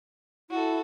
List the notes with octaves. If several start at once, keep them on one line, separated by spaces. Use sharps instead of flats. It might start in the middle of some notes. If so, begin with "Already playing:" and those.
E4 F#4 A4